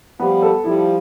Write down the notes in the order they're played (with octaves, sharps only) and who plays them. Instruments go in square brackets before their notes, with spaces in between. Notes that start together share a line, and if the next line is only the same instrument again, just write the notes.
[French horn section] F3 G3 [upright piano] B3
[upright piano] A4
[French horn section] F3 G3 [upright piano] E4